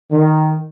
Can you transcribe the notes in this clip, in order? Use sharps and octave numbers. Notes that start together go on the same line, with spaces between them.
D#3